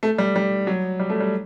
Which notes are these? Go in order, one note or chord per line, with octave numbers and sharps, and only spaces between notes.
A3
G3
G3
F#3
G3
A3
G3